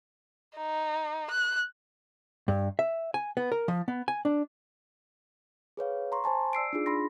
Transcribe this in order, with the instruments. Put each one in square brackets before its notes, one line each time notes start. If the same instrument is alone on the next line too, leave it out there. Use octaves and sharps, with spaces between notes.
[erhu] D#4
F#6
[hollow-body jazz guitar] G2
E5
G#5
B3
A#4
F3
B3
G#5
D4
[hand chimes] G#4 B4 C#5 F5
A#5 C6 C#6
C5 G#5 A5 C6
D5 E6 C7 D7
D4 D#4 F4 G#4
D4 B5 C6 A#6